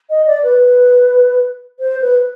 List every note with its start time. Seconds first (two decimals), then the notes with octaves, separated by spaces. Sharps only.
0.09 D#5
0.26 D5
0.43 B4
1.79 C5
2.01 B4